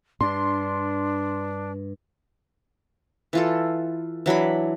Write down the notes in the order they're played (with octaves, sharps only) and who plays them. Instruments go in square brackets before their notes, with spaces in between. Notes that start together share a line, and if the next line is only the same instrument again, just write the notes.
[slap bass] G2 [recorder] D4 [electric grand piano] C6
[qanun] E3 F4 A4
E3 F#3 D4 B5